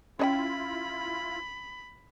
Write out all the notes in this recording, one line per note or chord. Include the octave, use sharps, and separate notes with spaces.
C#4 E4 F4 C#5 D#5 G5 B5